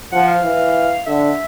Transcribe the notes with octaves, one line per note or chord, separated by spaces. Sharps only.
F3 F#5
F5
E3
D3 E5